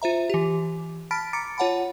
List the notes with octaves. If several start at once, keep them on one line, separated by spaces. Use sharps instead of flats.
F4 C5 E5 A#5
E3 G4
A5 B5 F6 A6 B6 D7
A#5 D6 A6 C#7 D7
F4 C#5 F#5 A5 B5